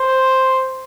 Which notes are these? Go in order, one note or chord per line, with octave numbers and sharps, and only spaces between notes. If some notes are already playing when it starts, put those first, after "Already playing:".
Already playing: C5